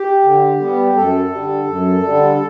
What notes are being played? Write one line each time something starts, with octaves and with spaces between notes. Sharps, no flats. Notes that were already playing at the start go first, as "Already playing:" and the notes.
Already playing: G4
D3
G3 B3
F#2 A4
D3 G3
F#2
D3 G3